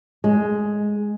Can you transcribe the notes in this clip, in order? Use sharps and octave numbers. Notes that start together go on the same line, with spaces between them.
G#3